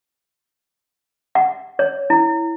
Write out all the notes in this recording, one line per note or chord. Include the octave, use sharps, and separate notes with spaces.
F#5
C#5
E4